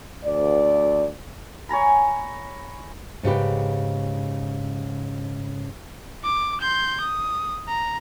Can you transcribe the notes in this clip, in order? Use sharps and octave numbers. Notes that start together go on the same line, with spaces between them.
D2 D5
C#5 G#5 A#5 B5
G#2 C#3 G4 B4
D6
C6 G6
D#6
A#5